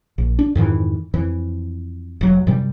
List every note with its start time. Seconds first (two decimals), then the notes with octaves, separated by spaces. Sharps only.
0.18 A#1
0.39 D4
0.55 F2 G#2 D#3 E3
1.14 F2 E3
2.21 F1 F#3
2.47 F#2 C3 E3 G3